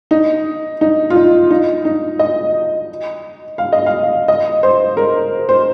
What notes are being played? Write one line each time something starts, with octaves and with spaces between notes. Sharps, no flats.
D#4
D#4
F4
D#4
D#4
D#4
D#5
F5
D#5
F5
D#5
C5
A#4
C5